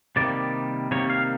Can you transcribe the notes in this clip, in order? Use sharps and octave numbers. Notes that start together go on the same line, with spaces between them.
C3 D#3 G3 A#3 D5
C3 D#3 G3 A#3 C#5
F5